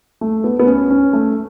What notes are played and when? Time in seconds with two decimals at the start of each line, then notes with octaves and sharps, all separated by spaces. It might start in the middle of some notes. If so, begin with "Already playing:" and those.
0.21 A3
0.44 B3
0.59 B3
0.67 C#4
0.90 C#4
1.13 A3